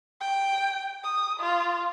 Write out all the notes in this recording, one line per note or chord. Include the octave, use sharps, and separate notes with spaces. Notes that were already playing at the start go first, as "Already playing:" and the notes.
G5
D#6
F4